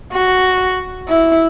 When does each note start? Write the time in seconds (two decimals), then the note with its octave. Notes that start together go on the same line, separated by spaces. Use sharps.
0.13 F#4
1.08 E4